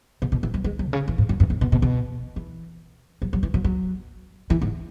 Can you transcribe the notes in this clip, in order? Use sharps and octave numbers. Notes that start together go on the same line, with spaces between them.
B2
B2
E3
F#3
G#3
F#3
B2
C#3
E3
G#2
F#2
F#2
G#2
B2
B2
B2
E3
F#3
F#3
E3
F#3
F#3
E3
G#2